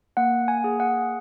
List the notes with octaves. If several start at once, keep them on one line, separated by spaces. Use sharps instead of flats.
A#3 F#5
G#5
G#4
F#5